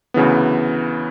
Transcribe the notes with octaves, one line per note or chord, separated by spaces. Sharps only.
D2 C#3 E3 B3